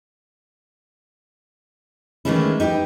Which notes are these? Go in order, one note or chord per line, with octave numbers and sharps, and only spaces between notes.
D#3 E3 G#3 A3 C#4 E4
D#4 G4 B4